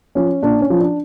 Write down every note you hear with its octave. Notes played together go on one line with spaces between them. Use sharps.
F3 C#4
A#2 D4
C#4
F3
D4